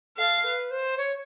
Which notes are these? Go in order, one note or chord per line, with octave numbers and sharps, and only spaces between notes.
A4 F5
B4
C5
C#5